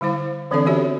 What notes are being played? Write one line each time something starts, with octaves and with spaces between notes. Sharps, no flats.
D3 G3 E4 C5 F5
D3 E3 C4 D4 A4 D5
B3 C#4 F#4 G4 C#5 E5